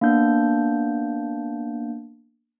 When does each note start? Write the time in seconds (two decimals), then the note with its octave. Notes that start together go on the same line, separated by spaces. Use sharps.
0.01 A#3 B3 D4 G6